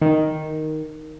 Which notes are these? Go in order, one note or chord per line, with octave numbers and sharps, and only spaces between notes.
D#3